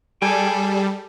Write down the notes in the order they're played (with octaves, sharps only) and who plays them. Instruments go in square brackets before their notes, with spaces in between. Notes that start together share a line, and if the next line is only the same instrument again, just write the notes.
[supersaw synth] G3 [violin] G#4 A4 [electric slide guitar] G5 G#5